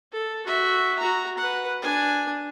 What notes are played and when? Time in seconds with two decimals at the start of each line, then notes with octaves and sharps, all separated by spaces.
0.12 A4
0.46 F#4 E5
0.99 F#4 A#5
1.38 B4 F#5
1.82 D4 G#5